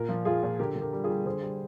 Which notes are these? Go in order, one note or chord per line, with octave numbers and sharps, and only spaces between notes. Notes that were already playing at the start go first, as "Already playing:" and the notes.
Already playing: A#2 A#4
F3
F3 F4 G#4
A#2
D3 G4 A#4
D3
G4 A#4
G3
F4 G#4
G3
D3 G#4 C5
G3